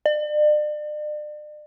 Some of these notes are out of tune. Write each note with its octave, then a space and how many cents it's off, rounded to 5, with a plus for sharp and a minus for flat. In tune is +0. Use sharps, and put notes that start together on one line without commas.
D5 +40